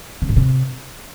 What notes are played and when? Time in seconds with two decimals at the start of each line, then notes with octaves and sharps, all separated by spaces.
0.22 C3
0.29 G#2
0.36 C3